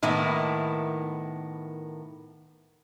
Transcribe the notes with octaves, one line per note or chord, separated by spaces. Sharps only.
A2 D#3 A#3 B3 E4